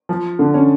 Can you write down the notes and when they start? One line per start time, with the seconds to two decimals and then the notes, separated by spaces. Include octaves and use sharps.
0.09 F3
0.39 D3
0.54 C#4